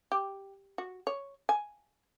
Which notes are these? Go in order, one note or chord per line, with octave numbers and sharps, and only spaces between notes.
G4
F#4
C#5
G#5